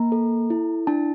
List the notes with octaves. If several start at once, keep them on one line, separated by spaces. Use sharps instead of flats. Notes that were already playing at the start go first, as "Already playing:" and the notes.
Already playing: A#3 A#5
A4
E4
D4 A5